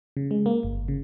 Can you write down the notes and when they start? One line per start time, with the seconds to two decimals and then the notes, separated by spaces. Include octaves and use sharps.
0.17 C#3
0.31 G#3
0.46 A#3
0.63 G1
0.88 C#3